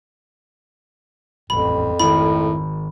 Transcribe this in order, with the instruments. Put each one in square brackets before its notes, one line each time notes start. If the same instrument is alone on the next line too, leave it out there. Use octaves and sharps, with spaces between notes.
[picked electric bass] D#1 A1 [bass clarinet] F2 [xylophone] B5
[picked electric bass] G#1 D#3 [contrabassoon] A2 [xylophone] B5